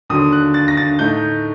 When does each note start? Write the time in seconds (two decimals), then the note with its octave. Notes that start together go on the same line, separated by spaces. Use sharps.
0.10 D#2 D3 F#3 D#6
0.32 F#6
0.54 A6
0.68 A#6
0.77 A6
0.99 A2 A3 D#4 G6